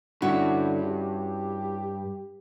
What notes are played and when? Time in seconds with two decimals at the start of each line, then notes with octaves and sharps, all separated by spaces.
0.22 G2 D3 C#4 E4 F#4
0.84 G4